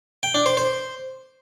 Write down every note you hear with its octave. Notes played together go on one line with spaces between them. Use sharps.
G5
D4
C5
C5